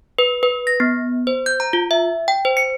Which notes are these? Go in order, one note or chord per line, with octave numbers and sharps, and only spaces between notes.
B4
B4
A#6
B3
C5
G6
A#5
F4
E5
G5
C5
C#7